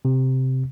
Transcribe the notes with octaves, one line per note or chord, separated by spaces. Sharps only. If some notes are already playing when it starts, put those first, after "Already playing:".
C3